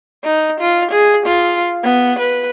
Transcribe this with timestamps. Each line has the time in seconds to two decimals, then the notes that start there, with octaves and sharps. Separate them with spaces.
0.24 D#4
0.60 F4
0.91 G#4
1.26 F4
1.83 B3
2.19 B4